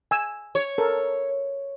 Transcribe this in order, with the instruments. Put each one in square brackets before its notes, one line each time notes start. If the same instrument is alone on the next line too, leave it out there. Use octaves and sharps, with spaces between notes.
[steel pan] G#5 E6
[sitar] C#5
[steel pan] A4 A#4